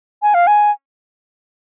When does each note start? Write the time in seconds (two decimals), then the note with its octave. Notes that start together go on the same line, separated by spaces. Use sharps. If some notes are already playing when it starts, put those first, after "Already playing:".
0.22 G#5
0.34 F5
0.47 G#5